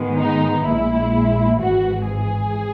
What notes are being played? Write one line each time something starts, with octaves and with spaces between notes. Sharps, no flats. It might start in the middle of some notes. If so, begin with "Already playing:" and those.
Already playing: G#2 D#3 G#3 B3
D#4
A#1 A#2 G#3 E4
G#1 G#2 E3 F#4
G#4